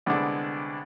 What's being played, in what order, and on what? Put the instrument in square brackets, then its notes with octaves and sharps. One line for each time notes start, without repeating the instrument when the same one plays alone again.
[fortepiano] C2 D3 G#3 B3 D4